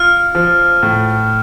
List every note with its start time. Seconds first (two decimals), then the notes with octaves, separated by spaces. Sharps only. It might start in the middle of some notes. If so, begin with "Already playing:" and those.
Already playing: F4 F6
0.35 F3
0.83 A2